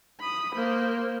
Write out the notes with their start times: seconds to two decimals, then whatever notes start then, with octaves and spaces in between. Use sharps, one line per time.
0.20 B5 D#6
0.54 A#3 C5